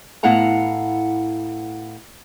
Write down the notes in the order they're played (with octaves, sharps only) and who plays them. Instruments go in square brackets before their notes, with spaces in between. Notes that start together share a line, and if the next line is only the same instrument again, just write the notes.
[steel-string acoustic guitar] A2 B3 E4 F5 F#5 A#5